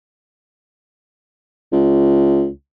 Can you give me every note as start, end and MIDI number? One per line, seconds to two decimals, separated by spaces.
1.72 2.48 37